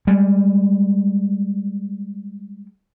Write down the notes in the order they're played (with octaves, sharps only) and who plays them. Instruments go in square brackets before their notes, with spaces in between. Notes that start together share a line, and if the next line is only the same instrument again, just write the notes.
[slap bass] G3 G#3